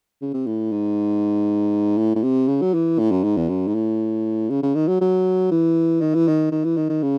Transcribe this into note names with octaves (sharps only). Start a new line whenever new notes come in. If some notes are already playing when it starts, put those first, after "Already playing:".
C#3
C3
A2
G#2
A2
A2
C3
C#3
F#3
E3
A2
F#2
G#2
E2
F#2
G#2
A2
C#3
C#3
D#3
F#3
F#3
E3
D#3
E3
D#3
D#3
E3
D#3
D#3
C#3